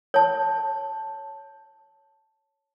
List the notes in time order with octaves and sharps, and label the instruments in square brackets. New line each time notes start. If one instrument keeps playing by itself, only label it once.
[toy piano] C#5 A5